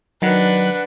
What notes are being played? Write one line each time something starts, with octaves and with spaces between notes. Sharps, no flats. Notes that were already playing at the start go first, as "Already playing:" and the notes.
D#3 F#3 D4 B4 F#5